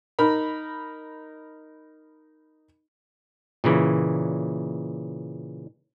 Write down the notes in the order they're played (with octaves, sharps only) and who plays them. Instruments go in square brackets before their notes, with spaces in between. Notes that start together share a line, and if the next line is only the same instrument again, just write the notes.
[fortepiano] D#4 A#4 B5
[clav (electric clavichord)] A#2 C#3 E3